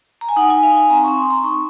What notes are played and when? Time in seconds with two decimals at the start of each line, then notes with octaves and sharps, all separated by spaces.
0.21 A#5
0.29 G#5
0.36 D#4 F#5
0.50 D#4 G#5
0.63 F5
0.72 D#4 G#5
0.90 C4 A#5
1.04 C4 C#6
1.17 C6
1.26 C4 A#5
1.43 D#4 C#6